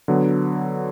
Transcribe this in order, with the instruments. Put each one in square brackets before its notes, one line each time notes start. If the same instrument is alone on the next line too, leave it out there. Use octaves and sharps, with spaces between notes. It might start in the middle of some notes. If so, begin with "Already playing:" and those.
[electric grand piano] D3 F#3 B3